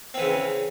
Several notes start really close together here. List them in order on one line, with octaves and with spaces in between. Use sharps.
C4 E3 C#3